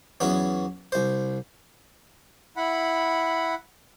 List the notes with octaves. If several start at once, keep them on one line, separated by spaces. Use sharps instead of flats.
E2 F#3 B3 C#4
C2 C5
E4 F#5 B5